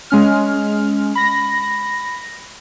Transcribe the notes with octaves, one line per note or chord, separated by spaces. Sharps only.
G#3 C#4 F6
B5 A#6